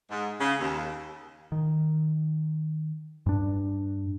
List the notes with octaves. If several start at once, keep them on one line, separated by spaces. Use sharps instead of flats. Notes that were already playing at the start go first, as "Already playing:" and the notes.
G#2
C#3
D#2
D#3
G2 D4